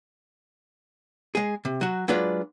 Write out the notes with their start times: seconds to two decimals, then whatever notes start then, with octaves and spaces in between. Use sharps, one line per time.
1.35 G#3 G#4
1.65 C3
1.81 F#3 F#4
2.08 F#3 G#3 D4 F4 B4 D5